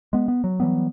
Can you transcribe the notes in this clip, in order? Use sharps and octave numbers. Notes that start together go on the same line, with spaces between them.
G#3 B3
B3
F#3
E3 F#3 G3 B3